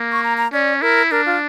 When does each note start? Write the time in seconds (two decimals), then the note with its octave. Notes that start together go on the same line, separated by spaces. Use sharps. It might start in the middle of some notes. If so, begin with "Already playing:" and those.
Already playing: A#3
0.12 C#6
0.23 A#5
0.37 A#5
0.52 C#4 D5
0.82 E4 A#4
1.11 D4 A#4
1.26 F4